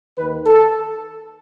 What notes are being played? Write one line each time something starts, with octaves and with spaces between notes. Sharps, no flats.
D#2 D#3 B4
A4